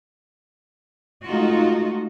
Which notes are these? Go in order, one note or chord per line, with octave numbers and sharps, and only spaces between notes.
G#3 A3 D#4 F4 F#4